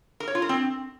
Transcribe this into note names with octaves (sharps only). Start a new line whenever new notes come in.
A#4
C#5
F4
A#4
C4